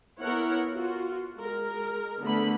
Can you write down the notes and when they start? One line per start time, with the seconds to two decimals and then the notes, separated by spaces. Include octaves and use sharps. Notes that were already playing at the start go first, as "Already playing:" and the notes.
0.21 B3 E4 A#4 C#5 F#5
0.73 F4 F#4
1.38 G#3 A#4
2.22 D3 A3 B3 B5